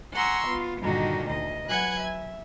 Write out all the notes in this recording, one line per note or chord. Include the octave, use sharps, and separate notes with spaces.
F#5 G#5 A#5 C6 C#6 E6
B3 F4
G2 A#2 D3 D#3 D#4 F#4
D2 D#5
F#3 B4 F#5 G#5 F#6 G#6
E5